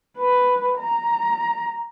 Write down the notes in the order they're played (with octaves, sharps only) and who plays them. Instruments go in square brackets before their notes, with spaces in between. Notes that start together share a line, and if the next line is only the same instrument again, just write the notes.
[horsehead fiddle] B4
A#5